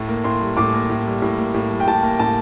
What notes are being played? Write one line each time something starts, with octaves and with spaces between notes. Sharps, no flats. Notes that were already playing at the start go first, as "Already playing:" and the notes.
Already playing: A2
A#3
A2 C6
G3
A2 D6
A#3
A2
G3
A2
A#3
A2
G3
G5
A2 A5
A#3
A2 A5